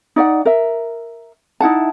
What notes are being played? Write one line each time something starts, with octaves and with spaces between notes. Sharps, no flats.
D#4 D5 E5 F#5
A#4 E5
D#4 E4 F#5 A5